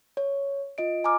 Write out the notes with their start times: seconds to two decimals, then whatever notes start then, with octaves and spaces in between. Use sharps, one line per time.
0.17 C#5
0.78 F4 D#5 D7
1.04 G#5 A#5 D6 F6